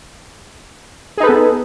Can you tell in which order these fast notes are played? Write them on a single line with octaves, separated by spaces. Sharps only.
G#4 D#4 B4 A4 B3